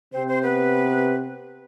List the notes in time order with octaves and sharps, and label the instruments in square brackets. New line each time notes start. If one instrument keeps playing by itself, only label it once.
[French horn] C3 [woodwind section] C4 C5
[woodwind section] C4 C5
B3 B4